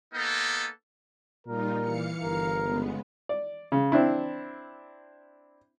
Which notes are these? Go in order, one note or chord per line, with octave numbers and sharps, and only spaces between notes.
A#3 B3 D#4 A4
A#2 G3 D#4 F4 A#4
E3 F5 C#7
G1 A#4
C#3 G#3 B3
D5
C#3
C4 D4 E4